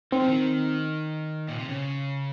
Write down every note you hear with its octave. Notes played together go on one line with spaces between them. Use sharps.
D#3 C4
F3
D#3
A#2
C3
C#3